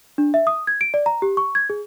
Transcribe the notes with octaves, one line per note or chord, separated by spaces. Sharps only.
D4
E5
D#6
G#6
D7
D5
A#5
G4
C#6
G#6
G#4